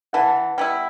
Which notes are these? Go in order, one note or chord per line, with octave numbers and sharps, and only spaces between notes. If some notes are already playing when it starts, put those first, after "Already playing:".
E3 F#5 A5
G3 B3 E4